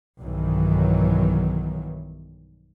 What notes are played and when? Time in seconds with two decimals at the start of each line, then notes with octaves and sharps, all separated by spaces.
0.20 B1 G2 D#3 E3 F#3